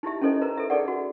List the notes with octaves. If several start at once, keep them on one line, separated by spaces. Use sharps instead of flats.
D#4 E4 G4 E5
C#4 D#4 E4 A4 C5 D#5
B4 C5 A#5
A4 E5
D#4 G#4 A4 D5 F#5
F#4